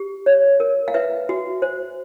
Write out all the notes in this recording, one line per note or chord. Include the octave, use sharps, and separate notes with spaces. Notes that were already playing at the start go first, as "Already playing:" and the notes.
Already playing: G4
C#5
A#4
F5
B4 E5
F#4
C5